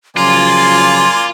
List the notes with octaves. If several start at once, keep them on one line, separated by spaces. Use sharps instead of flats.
C#3 F3 F#3 A#3 F4 D5 G#5 C6